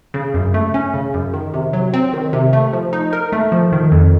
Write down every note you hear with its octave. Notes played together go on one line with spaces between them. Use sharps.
C#3
F#2
A3
C#4
C#3
F#2
D#3
C3
F#3
C4
D#3
C3
A3
F3
D#4
A#4
A3
F3
D#3
F2